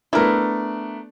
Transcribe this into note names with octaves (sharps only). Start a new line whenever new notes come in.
A3 B3 D4 E4 A#4